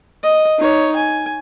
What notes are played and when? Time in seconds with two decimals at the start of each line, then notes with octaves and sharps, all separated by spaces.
0.23 D#5
0.59 D#4 C#5
0.96 G#5